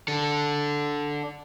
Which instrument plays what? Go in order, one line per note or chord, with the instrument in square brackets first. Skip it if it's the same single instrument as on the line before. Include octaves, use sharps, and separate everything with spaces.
[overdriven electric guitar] D4 A4